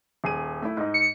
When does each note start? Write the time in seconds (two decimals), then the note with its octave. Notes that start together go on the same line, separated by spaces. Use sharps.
0.24 D#1 G#4 D#7
0.62 A3 E4
0.77 G#2 D#4
0.94 C#7